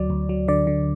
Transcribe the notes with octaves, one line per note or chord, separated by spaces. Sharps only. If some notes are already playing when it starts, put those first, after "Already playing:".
Already playing: D2 F#3 D5
D2
F#3
D3 D5
D3